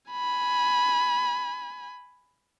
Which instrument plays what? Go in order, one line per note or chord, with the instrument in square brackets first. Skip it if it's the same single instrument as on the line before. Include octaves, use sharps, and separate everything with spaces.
[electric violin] G#5 B5